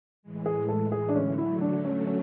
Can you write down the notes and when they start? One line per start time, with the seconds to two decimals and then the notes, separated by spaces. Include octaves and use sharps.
0.23 A2 E3 G#3
0.46 G#4
0.68 A4
0.92 G#4
1.09 D4
1.15 D3 F#3 A3 C#4
1.38 E4
1.61 D4
1.85 C#4
2.07 C#4